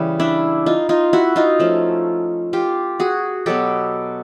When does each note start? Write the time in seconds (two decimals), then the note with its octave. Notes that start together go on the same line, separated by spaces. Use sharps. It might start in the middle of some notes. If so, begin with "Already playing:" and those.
Already playing: C#3 E3 G3
0.20 D4 E4
0.66 D#4 F4
0.89 D#4 F4
1.13 E4 F#4
1.36 D#4 F4
1.59 F3 A3 C#4
2.53 F4 G4
3.00 F#4 G#4
3.46 B2 F#3 B3 G4 A4